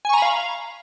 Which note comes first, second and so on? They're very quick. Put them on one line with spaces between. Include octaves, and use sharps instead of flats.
G#5 C#6 A#5 B5 F5